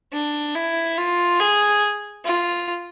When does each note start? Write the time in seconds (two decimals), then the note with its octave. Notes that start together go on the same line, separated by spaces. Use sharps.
0.13 D4
0.55 E4
0.98 F4
1.40 G#4
2.25 F4